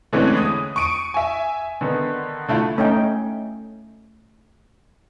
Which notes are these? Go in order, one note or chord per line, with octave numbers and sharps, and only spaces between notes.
D3 E3 G#3 A3 C4 C#4
D#6
C#6 D7 D#7
E5 G#5
D3 D#3 B3
D3 A3 E4 F4
A3 C#4 D#4 G5